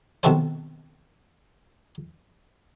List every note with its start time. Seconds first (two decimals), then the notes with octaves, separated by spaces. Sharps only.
0.23 B1 C3 D#3 F#4 A4 C5